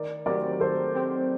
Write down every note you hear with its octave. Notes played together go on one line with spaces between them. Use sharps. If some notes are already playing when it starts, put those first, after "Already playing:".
Already playing: D#3 A#4 D5
F#3 C4 G4 A#4 D5
D#3 A4 C5
F#3 C4 G4